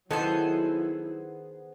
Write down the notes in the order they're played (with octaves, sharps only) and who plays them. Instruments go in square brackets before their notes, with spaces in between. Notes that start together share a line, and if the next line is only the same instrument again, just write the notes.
[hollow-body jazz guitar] D#3 D#4 A4 [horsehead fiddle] F#3 E4 [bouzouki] B3 G#4 C5